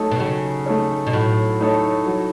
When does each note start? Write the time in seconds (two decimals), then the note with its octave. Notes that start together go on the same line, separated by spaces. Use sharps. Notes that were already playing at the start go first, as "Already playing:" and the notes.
Already playing: F#3 A3 D#4 A4 C#5
0.11 B2
0.19 C#3 F#3
0.66 A3 D#4 A4 C#5
1.07 B2
1.13 A2 F#3
1.60 A3 D#4 A4 C#5
2.06 F#3